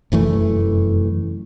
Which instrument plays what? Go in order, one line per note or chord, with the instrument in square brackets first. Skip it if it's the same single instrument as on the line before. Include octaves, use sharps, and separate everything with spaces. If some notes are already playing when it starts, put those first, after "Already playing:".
[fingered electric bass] F1 F#2 E3 A3